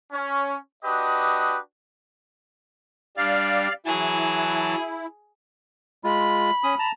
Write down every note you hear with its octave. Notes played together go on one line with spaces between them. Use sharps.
C#4
D4 F#4 G4 B4 D#5 D#6
G3 D4 D5 F5 F6
E3 F#3 E4 G#4 A5
G#3 F4 B5
C#4 D#6
A5 A#5